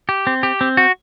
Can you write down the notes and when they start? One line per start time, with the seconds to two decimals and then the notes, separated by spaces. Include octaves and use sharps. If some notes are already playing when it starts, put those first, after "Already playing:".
0.09 G4
0.27 C4
0.43 G4
0.61 C4
0.77 F#4